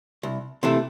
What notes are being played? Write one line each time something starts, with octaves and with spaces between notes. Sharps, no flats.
C2
C3 E3 A3